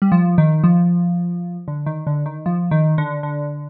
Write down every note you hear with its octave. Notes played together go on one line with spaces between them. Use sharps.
G3
F3
D#3
F3
D3
D#3
D3
D#3
F3
D#3
D3
D3